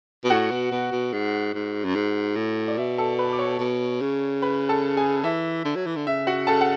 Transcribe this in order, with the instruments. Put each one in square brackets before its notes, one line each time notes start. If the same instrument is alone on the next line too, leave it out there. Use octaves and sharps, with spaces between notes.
[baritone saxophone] B2
[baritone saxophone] A2 [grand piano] F#4 F#5
[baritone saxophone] B2
B2
B2
G#2
G#2
F#2
G#2
A2
[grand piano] D5
[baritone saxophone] B2 [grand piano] E5
[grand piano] A4 A5
B4 B5
D6
C#5 C#6
[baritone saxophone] B2
C#3
[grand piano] B4 B5
A4 A5
G#4 G#5
[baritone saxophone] E3 [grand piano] E5
[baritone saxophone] D3
F#3
E3
D3
[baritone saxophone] C#3 [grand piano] E5
[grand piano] F#4 F#5
[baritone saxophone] C#3 [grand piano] A4 A5
[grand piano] F#5